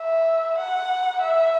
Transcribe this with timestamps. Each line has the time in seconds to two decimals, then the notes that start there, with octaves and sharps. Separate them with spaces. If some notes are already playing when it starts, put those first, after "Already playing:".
Already playing: E5
0.58 F#5
1.21 E5